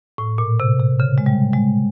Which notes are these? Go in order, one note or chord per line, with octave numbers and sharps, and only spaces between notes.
A2
A#2
C3
C3
C#3
G#3
G3
G#3